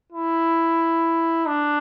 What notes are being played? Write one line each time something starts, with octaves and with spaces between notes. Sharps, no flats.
E4
D4